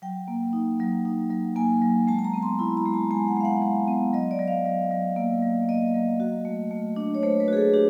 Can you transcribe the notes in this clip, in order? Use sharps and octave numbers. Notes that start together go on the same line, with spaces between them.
F#3 G5
A#3
D#4
F#3
D#4
F#3
A#3 G#5
F#3
G#3 A5
A5
A#5
B3
C6
E4 B5
A#5
G#3
A5
G#3 G#5
F#5
G#3 F5
F#5
G#3
B3
F#3 D#5
D5
F#3
F5
F#3
F#3
A#3
F#3
A#3 D#5
F#3
F#4
A3
A3
D4
C#5
A3 C5
B4
F#4 G#4
A4
D4 G4